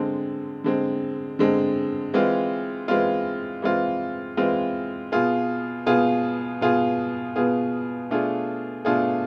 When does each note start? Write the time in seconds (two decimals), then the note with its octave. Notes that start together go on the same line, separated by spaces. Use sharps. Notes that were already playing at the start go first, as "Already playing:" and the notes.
Already playing: D3 G#3 C4
0.64 D3 G#3 C4
1.39 D3 G#3 C4
2.14 E3 G#3 C4 F4
2.88 E3 G#3 C4 F4
3.62 E3 G#3 C4 F4
4.37 E3 G#3 C4 F4
5.12 B2 B3 F4 G#4
5.86 B2 B3 F4 G#4
6.61 B2 B3 F4 G#4
7.36 B2 B3 F4 G#4
8.10 B2 A3 D4 F4 G#4
8.85 B2 A3 D4 F4 G#4